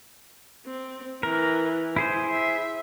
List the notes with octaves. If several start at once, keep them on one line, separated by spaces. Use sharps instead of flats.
C4
E3 A#4
E4 G#4 C5
E5